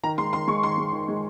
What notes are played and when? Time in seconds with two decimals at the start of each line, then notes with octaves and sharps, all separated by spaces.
0.03 D#3 A#5
0.18 G#3 C6
0.33 D#3 C6
0.47 G#3 C#6
0.63 D#3 C6
0.78 G#3
0.93 D#3
1.08 G#3